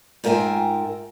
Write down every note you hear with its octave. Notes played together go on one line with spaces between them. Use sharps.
G#2 F4 A#4 E5 G5 G#5